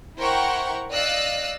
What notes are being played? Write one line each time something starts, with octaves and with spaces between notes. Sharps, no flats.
E4 A#4 C5 F#5 G5 C#6
D5 D#5 F5 E6 F#6